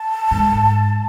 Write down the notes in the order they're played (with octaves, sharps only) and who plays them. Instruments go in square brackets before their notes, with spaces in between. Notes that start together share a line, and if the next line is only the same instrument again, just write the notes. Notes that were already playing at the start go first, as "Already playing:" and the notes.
Already playing: [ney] A5
[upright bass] G#2